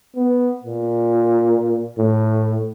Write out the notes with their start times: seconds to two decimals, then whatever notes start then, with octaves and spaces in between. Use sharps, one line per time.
0.16 B3
0.64 A#2
1.98 A2